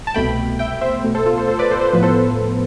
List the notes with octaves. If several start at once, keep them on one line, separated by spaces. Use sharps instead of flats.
A5
C2 B2 A3 G5 B5
E5 G5
C5 E5
B2 A3
A4 C5
F4 A4
A4 C5
A4 C5
B4 D5
A4 C5
C5
A2 F3 B3 B4
A4 C5